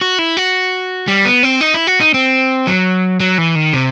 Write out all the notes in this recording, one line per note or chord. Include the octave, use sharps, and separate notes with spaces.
F#4
E4
F#4
G3
B3
C4
D#4
E4
F#4
D#4
C4
F#3
F#3
E3
D#3
C3